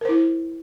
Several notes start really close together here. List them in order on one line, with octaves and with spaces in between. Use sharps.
A#4 C5 E4